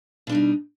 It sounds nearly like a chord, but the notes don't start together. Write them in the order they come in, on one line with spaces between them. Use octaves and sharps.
B2 D4 G3 D#4